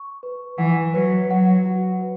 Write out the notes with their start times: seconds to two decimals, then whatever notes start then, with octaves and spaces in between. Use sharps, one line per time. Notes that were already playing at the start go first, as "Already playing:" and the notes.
Already playing: C#6
0.23 B4
0.58 E3 F#5
0.94 F#3 B4
1.30 F#3 F#5
1.66 F#4
2.02 B4